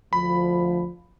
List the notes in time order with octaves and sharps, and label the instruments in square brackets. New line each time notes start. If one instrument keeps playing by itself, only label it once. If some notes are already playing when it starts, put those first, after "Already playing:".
[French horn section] D2 F3 [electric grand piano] B5